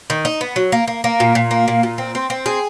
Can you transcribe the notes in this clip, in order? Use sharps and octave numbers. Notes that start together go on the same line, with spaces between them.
D#3
D#4
B3
F#3
A#3
A#3
A#3
A#2
A#2
A#3
A#2
A#2
C4
C4
C4
G#4